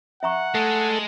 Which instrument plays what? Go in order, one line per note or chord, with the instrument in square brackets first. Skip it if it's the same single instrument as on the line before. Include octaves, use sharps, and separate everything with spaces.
[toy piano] E5 A#5 C#6 [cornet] F#5
[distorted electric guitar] G#3 G#4 [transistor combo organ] A3 A4